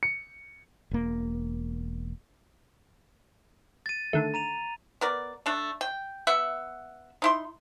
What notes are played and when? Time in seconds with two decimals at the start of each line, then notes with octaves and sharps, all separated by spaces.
0.03 C#7
0.91 E1 A#3
3.86 A6 D#7
4.13 D3 D#3 A3
4.34 A#5 D#7 F7
5.01 B3 A#4 D5
5.46 A3 D4
5.81 G5
6.27 B3 E5 F#5
7.22 D#4 E4 C6